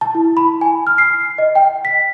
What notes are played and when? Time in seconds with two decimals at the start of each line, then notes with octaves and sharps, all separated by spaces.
0.01 A5
0.15 E4
0.37 B5
0.61 G#5
0.87 F6
0.98 C7
1.38 D#5
1.55 G5
1.85 B6